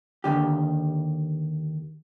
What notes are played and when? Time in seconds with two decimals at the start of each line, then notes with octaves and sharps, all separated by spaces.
0.24 D#2 G#2 D3 G4